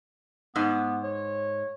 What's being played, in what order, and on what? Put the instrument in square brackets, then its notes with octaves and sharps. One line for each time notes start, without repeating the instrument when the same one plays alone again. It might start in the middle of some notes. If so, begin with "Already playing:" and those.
[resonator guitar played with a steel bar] G#2 [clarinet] B3
[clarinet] C#5